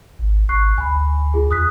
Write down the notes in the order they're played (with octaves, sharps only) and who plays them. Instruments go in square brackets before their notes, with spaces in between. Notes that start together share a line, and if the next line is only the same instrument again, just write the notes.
[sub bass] G#1
[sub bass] G#1 [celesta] C#6 F#6 C7
[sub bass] D2 [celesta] G#5 B5
[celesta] F4 G#4
[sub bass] E2 [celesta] D#6 F#6 B6